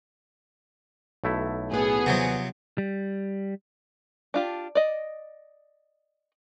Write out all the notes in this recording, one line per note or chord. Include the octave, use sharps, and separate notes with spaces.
B1 A3 E4
A2 B3 G#4 B4
D#2 C3 F3 F#3 F#5
G3
D4 F4 G4
D5 D#5